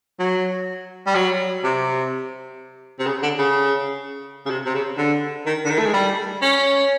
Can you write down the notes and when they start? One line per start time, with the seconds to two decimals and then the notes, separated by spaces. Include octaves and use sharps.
0.19 F#3
1.07 G3
1.15 F#3
1.64 C3
2.99 C3
3.06 C#3
3.23 D3
3.38 C#3
4.46 C#3
4.50 C3
4.65 C3
4.74 C#3
4.98 D3
5.46 D#3
5.65 D3
5.70 D#3
5.78 A3
5.86 G#3
5.94 G3
6.42 C#4